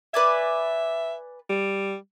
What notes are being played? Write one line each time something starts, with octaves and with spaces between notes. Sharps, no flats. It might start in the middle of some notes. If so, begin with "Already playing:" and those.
B4 D5 E5 G#5
G3